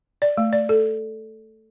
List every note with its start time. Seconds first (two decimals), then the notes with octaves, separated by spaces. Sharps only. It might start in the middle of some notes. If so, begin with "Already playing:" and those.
0.22 D5
0.37 A3
0.53 D5
0.69 A4